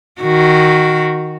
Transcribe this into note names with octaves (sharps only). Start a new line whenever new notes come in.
D#3 F#4